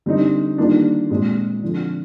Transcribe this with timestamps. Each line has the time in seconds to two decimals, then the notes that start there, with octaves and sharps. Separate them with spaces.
0.06 D3 G3 C4 D#4
0.58 D#3 G3 A#3 D4 F4
1.10 A#2 G#3 C4
1.63 D3 F3 C4 F4